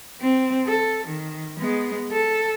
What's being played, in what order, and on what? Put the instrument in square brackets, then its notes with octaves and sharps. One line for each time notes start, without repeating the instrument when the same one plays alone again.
[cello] C4
A4
D#3
G#3 B3
A4